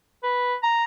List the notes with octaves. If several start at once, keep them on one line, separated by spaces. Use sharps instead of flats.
B4
A#5